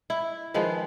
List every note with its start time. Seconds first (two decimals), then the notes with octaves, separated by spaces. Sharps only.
0.10 E4
0.54 D#3 F3 G#3 B4